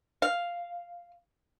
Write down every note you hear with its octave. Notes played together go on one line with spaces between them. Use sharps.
F5